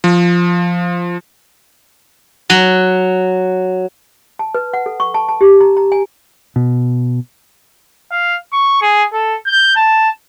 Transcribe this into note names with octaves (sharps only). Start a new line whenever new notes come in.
F3
F#3
A5
B4
F#5
A4
C#6
A5
A5
G4
A#5
A#5
G#5
B2
F5
C#6
G#4
A4
G6
A5